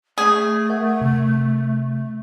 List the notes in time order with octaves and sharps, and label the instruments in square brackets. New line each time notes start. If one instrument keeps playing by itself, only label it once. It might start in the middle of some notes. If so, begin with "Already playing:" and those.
[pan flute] A3 [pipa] G#4
[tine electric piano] A#4 E5 F#5
C3